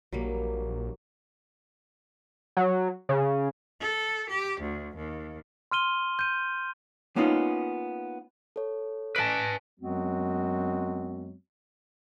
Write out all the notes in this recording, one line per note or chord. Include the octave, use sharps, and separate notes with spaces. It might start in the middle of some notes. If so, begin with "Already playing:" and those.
A#1 F#3 G3 A#3
F#3
C#3
A4
G4
D2
D#2
C6 F6 D#7 G7
G6 D#7
A#3 B3 C#4 D#4 F4
A4 C#5
B4 G#5 A5 B6 D7
F#2 F#3 G#3 B3 C4 F#4